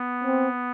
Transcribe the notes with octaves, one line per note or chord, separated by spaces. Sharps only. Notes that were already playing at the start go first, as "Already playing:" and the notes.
Already playing: B3
C4